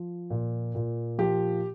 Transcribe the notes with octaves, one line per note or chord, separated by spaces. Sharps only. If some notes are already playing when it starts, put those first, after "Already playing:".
Already playing: F3
A#2
A#2
F3 G4